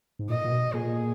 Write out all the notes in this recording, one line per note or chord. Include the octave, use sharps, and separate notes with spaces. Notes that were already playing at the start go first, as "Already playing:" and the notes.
G#2
A#2 D#5
A#2
B2
A#2 G#4